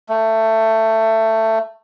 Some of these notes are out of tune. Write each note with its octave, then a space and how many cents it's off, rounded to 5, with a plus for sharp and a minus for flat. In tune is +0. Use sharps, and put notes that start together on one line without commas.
A3 +15